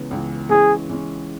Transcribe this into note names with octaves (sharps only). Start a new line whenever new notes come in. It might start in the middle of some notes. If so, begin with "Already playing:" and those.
Already playing: C#2 C#3 E3 B3
C#2 C#3 E3 B3
E3 G#3 C#4 G#4
E3 G#3 C#4